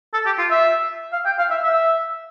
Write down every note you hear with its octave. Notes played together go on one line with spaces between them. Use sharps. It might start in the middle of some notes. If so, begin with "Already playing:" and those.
A4
G4
F4
E5
F5
G5
F5
E5
E5